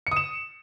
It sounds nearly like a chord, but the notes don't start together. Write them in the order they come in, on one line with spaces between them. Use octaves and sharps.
C#7 D#6 E7